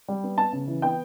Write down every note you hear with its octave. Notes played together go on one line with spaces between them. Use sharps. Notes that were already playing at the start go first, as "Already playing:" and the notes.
G3
B3
B3 A5
C#3
E3
B3 G5